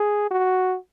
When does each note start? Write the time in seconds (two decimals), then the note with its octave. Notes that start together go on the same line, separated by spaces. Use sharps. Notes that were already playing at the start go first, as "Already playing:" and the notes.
Already playing: G#4
0.31 F#4